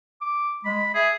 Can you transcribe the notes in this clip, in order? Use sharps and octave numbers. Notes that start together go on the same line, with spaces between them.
D6
G#3 B5
G#4 E5